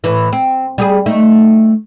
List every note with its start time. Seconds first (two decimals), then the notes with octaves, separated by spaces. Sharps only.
0.04 A2 E3
0.33 C4
0.78 G3 G4 G#4
1.06 A3 D#4